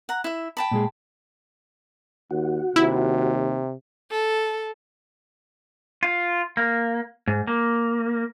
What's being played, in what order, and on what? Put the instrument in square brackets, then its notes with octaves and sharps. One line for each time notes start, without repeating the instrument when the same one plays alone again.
[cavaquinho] F#5 A#5
E4 E5
G5 A5 B5
[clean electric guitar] A#2 G#3 G#4
[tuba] D#2 [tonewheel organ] F#4
[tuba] D#2 [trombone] C3 [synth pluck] E4
[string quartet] A4
[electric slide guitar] F4
A#3
G#2
A#3